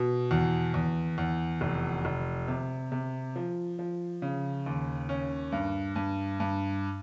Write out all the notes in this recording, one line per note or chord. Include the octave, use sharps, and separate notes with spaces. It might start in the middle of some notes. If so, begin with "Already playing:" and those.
Already playing: B2
E2
E2
E2
F1
F1
C3
C3
F3
F3
C#3
D#2
C#4
G2
G2
G2